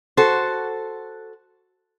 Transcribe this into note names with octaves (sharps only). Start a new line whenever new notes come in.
F#4 A4 C5